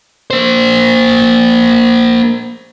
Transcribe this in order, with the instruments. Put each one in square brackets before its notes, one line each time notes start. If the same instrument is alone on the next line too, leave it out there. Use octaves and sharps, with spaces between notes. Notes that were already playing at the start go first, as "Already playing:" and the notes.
[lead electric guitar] A#3 C5